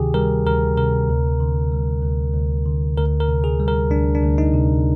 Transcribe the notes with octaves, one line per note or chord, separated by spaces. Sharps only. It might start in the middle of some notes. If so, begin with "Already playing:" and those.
Already playing: D2 C3 D#3 G4 G#4
G3 A#4
D2 A#4
C3 A#4
D2
D3
G3
D2
D2
D3
D2 A#4
A#4
C3
G#4
G3
A#4
D2 D4
D4
D2
D#4
C3